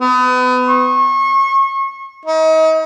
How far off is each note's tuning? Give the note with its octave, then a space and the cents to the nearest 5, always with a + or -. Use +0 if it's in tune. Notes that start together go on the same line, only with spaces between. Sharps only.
B3 +30
C#6 -35
D#4 +35